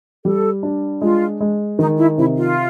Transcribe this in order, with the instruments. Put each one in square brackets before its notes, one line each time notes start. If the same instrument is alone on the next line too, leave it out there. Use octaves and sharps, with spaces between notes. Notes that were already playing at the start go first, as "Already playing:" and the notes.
[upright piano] G3 [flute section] A4
[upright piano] D4
[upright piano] G#3 [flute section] F4
[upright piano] G#3
[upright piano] D#3 [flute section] D#4
[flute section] E4
[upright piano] C3 [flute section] E4
[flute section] F4